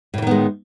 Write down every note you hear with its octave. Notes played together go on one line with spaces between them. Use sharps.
A2 D#3 E3 G#3 B3